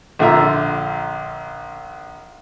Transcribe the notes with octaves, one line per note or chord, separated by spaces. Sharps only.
A#1 D3 F4 E5 A#5